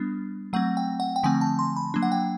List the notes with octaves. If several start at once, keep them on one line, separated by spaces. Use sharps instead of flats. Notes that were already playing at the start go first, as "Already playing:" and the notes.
Already playing: G3 B3 D4
F#3 A3 C4 F#5
G5
F#5
G5
D3 F3 A3 C4 G#5
A5
C6
B5
F#3 A#3 D4
F#5
G5